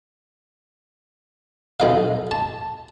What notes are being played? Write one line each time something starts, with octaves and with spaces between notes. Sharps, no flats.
B1 D#4 F5
A5